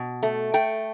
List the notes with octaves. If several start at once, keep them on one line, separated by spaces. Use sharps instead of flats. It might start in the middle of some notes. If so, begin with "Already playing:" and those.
Already playing: B2
A3
A3 G5